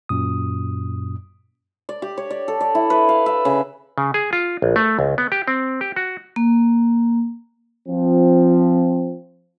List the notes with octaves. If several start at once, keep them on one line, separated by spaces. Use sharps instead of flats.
F#2 A#2 D#6
D5
G4
C#5
D5
A4
D5
E4
B4
F5
E5
C#3
C#3
G#4
F4
A#1
A3
C#2
B3
G4
C4
G4
F#4
A#3
F3 C4